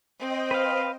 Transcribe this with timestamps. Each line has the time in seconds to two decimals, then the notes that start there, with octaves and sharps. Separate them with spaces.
0.19 C4 C5 D#5 G5
0.51 B4 F5